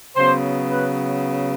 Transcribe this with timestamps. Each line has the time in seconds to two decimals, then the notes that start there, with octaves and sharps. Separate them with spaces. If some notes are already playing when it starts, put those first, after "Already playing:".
0.16 C#3 F#3 B3 C5
0.72 B4